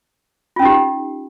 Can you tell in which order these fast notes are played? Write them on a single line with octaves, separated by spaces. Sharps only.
F4 C#4 D#4 G4